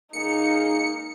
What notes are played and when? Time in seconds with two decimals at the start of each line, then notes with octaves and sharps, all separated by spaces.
0.13 C#2 A#3 D#4 G#4 C#7